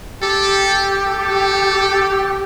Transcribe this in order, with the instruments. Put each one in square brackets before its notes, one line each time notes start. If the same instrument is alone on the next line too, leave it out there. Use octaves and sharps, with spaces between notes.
[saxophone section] G4 [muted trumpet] A4
[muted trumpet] A4